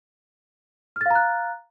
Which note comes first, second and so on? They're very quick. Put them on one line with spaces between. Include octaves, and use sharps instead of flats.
F6 A6 F5 A#5 F#6